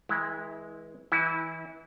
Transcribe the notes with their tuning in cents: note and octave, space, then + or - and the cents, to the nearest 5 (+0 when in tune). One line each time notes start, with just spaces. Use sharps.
E3 -35 G#3 +5 E4 -10
E3 -10 E4 -30